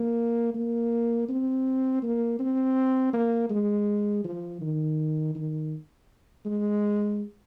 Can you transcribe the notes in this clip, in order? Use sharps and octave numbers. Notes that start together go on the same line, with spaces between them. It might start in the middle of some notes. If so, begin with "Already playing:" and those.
Already playing: A#3
A#3
C4
A#3
C4
A#3
G#3
F3
D#3
D#3
G#3